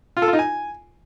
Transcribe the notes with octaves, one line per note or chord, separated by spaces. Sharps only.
F4
A4
F4
D#4
G#5